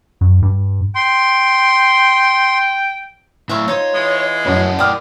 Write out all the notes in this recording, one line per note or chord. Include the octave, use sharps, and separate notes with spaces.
F#2
G2
G5 C6
A2 D3 E4 E5 F5 C#6
D#4 F4 C5 C#5
E3 G#3
F#2 E4 A#4 C#5 F#5
G4 D5 D#6 F6